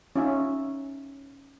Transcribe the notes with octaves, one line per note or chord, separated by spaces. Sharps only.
C#4 D#4 F4 E5 G#5